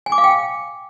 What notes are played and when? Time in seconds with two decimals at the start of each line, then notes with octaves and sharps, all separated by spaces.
0.06 G#5
0.12 D6
0.18 F5
0.24 G5